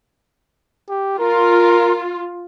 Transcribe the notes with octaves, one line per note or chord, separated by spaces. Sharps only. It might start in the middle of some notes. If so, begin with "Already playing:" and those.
G4
F4 A#4